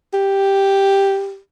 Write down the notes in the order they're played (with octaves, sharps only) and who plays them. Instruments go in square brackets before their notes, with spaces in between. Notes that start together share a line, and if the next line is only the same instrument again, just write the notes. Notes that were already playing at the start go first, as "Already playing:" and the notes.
[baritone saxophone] G4